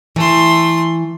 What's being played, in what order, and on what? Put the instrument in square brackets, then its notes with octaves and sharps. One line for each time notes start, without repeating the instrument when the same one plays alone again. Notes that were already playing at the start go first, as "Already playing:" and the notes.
[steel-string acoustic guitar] E3 [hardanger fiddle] A3 C6